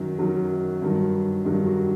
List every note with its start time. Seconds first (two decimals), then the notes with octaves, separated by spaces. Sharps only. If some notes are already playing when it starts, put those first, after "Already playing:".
Already playing: F#2 D#3 F#3
0.19 F#2 D#3 F#3
0.82 G2 D#3 F#3
1.45 G2 D#3 F#3 G4
1.66 F#4